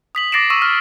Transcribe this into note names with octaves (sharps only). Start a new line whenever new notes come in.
D#6 B6 F#7
D6 A6 A#6 C7 D7 E7
C#6 E6 D#7 E7
F6